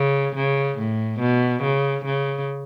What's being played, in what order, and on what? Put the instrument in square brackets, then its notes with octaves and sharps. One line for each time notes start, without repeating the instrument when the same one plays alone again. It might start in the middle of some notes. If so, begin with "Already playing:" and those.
Already playing: [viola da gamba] C#3
C#3
A2
B2
C#3
C#3